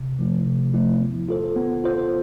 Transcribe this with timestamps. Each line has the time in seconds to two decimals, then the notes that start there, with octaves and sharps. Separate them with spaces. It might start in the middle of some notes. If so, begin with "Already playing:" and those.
Already playing: C3
0.19 F3 A3 E4
0.46 C3
0.74 F3 A3 E4
1.01 B3
1.29 F4 A4 C5
1.56 B3
1.84 F4 A4 C5